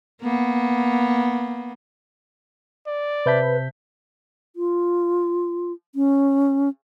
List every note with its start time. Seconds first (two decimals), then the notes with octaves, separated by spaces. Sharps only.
0.22 A#3 B3
2.87 D5
3.26 C3 B4 C5 E5 A5 G6 B6
4.56 F4
5.95 C#4